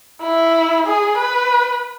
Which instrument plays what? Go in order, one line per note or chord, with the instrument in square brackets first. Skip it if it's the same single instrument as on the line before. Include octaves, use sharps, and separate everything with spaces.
[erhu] E4
G#4
B4